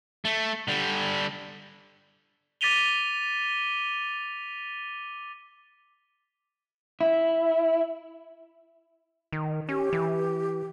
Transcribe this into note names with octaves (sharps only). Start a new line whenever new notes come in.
A3
D3 G3
D6 A6 B6 D#7 F7 G7
E4
D#3
C#4 G4
E3